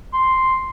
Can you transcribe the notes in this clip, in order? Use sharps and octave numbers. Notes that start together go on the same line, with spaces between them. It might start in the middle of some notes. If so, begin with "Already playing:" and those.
C6